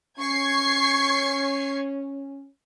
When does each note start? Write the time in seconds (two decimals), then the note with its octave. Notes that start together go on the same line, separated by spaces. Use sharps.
0.19 C#4 C#6 G#6 C7